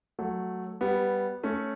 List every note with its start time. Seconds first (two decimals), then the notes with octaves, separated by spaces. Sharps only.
0.19 F#3 A3
0.81 G3 B3
1.43 A3 C#4